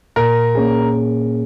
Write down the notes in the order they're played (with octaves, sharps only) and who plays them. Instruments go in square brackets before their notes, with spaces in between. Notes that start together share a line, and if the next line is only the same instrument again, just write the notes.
[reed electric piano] A#2 [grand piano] A#4
[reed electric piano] A#3 C#4 G#4